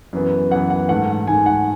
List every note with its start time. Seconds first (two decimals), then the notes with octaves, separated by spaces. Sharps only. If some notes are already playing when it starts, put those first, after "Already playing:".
0.13 F#2 E3 B3
0.51 F#2 E3 B3 F#5
0.70 F#5
0.89 G#2 D#3 A3 F#5
1.27 G#2 D#3 A3 G#5
1.46 F#5